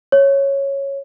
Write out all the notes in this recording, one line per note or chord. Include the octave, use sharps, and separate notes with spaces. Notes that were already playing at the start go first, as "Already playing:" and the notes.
C#5